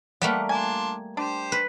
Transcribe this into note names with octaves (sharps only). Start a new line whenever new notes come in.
G3 A3 A#3 B4 F#5
D4 F4 G#5
D4 G4 C5
B4